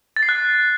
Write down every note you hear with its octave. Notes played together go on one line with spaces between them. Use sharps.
A6
C7
F#6